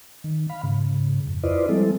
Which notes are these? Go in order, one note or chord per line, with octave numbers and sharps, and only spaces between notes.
D#3
F5 B5
G#2 C#3
F2
E4 F4 B4 C5 D5 D#5
F3 G3 G#3 C4 E4 A4